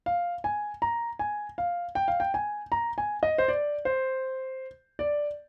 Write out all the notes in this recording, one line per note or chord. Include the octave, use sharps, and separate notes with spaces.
F5
G#5
A#5
G#5
F5
G5
F5
G5
G#5
A#5
G#5
D#5
C5
D5
C5
D5